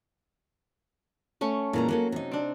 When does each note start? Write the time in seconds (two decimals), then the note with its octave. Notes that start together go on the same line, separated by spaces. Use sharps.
1.41 A3 C#4 C#6
1.73 A#2 E3 G#3 C#4 A#5
1.89 F#3 A#3 C#4 A4
2.12 C3 D#4
2.31 C4 D4